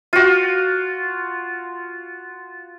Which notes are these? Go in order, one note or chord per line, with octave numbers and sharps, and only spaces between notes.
F4 F#4